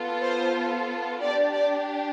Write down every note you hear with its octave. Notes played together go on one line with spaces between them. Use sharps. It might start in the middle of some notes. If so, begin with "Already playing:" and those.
Already playing: B3 F4 A4
C5
D4 G4 D5
D5